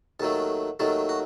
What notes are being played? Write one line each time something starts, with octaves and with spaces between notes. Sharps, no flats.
D#2 D#3 F#3 A3 A4
D#2 D#3 F#3 A3 A4
F#4